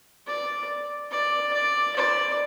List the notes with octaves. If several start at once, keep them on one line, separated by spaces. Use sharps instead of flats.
D5
D5
D5
D5